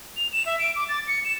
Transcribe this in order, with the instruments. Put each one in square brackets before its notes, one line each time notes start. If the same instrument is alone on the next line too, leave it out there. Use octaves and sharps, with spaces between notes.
[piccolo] F7
E7
E5
D7
D6
A6
C#7
E7